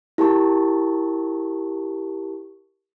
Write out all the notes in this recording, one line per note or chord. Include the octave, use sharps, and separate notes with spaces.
E4 G4 A#4 A5 C#6